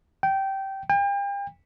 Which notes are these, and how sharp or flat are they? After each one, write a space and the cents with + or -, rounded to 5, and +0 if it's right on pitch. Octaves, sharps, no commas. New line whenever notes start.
G5 -15
G5 +40